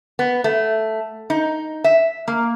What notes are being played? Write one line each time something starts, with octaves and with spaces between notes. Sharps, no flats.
B3
A3
D#4
E5
A#3